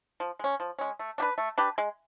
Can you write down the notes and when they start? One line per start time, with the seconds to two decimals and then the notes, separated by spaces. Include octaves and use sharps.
0.20 F3
0.39 G#3 C#4
0.60 F3
0.79 G#3 C#4
0.99 A3
1.18 D4 G4
1.22 B4
1.38 A3
1.58 D4 G4 B4
1.78 G#3